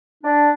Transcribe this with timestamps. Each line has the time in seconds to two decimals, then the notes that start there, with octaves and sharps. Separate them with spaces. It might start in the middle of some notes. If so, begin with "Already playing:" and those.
0.24 D4